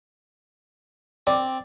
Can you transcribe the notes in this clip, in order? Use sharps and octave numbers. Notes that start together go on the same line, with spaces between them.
C4 D5